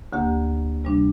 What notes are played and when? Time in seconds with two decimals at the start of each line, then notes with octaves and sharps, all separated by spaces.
0.13 D2 D3 A#3 G4
0.84 C3 G3 D4